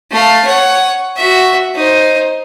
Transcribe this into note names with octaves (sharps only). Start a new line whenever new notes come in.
A3 F5
C#5 F#5
F#4 E5
D#4 C5